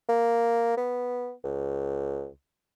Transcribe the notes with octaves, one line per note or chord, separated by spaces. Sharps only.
A#3
B3
C#2